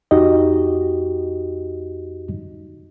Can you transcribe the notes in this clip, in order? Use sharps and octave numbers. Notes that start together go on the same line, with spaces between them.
F2 D#4 F#4 G4 D#5